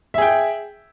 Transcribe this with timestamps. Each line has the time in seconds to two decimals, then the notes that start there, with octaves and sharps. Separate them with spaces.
0.14 E5
0.18 G#4
0.22 G5